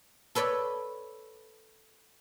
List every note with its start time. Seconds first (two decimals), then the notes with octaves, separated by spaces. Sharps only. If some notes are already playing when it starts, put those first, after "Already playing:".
0.35 A4 B4 C#5 D5 B5